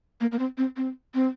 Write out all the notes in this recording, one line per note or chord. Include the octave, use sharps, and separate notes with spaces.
A#3
A#3
C4
C4
C4
C4